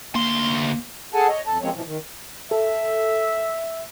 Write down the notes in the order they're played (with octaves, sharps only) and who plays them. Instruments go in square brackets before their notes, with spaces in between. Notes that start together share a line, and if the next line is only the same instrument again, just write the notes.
[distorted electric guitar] D2 C6 [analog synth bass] A#3
[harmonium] G#4 A4 F#5 G#5 A5
C#5 D#5
F2 A4 A5
F3 G#3 A#3 C4 C#4 C#5
B2 E3 F3
D#3
[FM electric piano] A4 [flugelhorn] E5